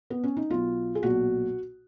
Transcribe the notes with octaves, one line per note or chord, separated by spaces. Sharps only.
B3
C#4
D#4
B1 B2 F4
G#4
B1 A#2 F#4